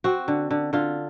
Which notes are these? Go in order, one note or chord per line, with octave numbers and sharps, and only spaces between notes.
C4 F#4
D3
D3
D3 F4